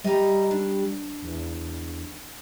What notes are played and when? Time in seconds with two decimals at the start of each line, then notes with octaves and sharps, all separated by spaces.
0.04 G3 D#5 A#5
0.51 D4
1.23 E2